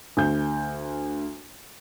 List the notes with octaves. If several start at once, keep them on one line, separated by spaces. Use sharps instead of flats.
D2 G6